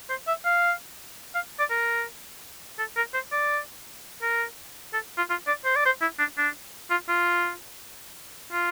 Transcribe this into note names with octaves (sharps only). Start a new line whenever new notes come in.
C5
E5
F5
F5
D5
A#4
A4
A#4
C5
D5
A#4
A4
F4
F4
D5
C5
D5
C5
E4
D4
D4
F4
F4
F4